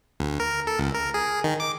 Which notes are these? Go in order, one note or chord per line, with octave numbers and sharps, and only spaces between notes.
D2
A#4
A4
C#2
A#4
G#4
D#3
D6